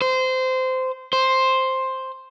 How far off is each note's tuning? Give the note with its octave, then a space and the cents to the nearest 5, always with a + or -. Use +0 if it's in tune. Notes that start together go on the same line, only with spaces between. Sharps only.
C5 -20
C5 +5